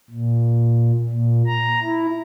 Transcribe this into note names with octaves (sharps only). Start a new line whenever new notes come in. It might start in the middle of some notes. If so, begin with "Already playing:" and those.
A#2
A#2
A#5
E4